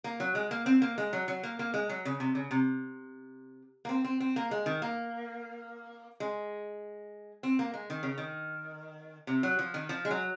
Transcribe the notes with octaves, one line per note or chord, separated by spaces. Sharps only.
A#3
F#3
G#3
A#3
C4
A#3
G#3
F#3
F#3
A#3
A#3
G#3
F#3
C#3
C3
C#3
C3
A#3
C4
C4
C4
A#3
G#3
D#3
A#3
G#3
C4
A#3
G#3
D#3
C#3
D#3
C3
F#3
F3
D#3
F3
G#3
F#3